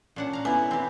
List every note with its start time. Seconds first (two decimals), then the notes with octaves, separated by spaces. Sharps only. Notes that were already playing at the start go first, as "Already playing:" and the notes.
0.16 A#2 C#4 D4 F#5
0.33 F5 A#5
0.45 A3 B3 E4 G#5
0.71 C4 G4 B4